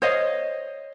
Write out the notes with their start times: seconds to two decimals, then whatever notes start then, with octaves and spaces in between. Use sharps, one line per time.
0.02 C5 C#5 D#5 F5